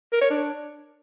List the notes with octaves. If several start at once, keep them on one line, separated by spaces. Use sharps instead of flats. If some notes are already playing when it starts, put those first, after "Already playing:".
A#4
C#5
D4